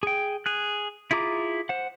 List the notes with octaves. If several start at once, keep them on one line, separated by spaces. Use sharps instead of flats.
G#4 G5
G#4 F#6
E4 F4 G#4 A#5 D6
C5 F#5